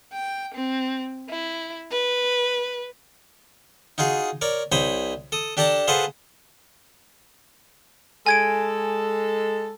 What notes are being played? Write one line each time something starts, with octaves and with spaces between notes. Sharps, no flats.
G5
C4
E4
B4
D#4 F4 F#4 G#4
A#4 C#5 D5
C2 C5 C#5 B5 D#6
A4 D#6
D4 G4 A4 D5 A5 A#5
F4 G#4 A4 B4 C5 F#5
G#3 A4 G#5 G#6 D7